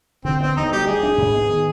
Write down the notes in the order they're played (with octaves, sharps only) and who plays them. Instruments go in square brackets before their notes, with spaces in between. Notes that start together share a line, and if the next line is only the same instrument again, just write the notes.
[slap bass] D3 [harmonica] C4
[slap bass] B3 [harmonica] C4
[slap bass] D2 [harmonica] D#4
[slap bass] G3 [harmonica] G4
[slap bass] G3 [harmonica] G#4
[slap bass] D4
G#2
B3
D#3